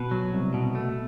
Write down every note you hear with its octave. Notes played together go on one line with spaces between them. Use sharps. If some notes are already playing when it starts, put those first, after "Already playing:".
Already playing: B2 B4
F#3
C2
B2
A3